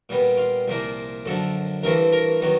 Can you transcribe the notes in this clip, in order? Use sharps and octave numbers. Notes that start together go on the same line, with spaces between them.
A#2 G3 B3
F4
C2 A#2 F3 A#3
F#2 D3 F3 A4
A1 G2 E3 A3 C4 A#4
A#4
D#3 F#3 B3